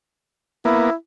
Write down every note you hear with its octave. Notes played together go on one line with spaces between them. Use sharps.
A#3 B3 E4